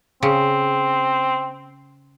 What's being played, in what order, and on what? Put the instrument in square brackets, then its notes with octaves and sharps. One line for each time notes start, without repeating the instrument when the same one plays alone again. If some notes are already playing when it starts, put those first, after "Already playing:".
[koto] C#3 [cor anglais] C4